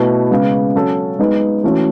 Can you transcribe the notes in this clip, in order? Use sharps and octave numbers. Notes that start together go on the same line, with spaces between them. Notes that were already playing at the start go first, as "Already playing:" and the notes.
Already playing: B2 A3 E4 B4
C#3 G#3 B3
F#3 C#4 F#4 A4
G#3 B3 D#4
E3 A3 C#4 F#4